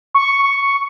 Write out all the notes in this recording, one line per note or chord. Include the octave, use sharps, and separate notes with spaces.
C#6